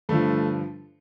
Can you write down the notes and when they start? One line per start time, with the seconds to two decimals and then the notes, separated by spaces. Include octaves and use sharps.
0.09 G2 D3 F3 A3